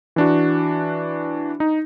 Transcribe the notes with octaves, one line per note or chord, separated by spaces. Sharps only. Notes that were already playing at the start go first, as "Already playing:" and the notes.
E3 D4 F#4
D#4